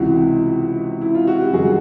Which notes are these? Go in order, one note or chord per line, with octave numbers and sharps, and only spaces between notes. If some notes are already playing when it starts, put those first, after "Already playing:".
Already playing: C#2 C3 E3 E4 F#4
E4
F4
F#4
G4
F#2 D#3 G3 F#4 G#4